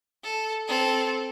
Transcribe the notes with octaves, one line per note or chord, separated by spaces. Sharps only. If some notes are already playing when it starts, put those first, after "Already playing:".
A4
C4 A4